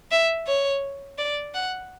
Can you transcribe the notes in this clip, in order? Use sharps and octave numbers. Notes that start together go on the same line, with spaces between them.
E5
C#5
D5
F#5